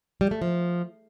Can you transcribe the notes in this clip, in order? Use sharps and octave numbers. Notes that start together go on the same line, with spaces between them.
G3
A3
F3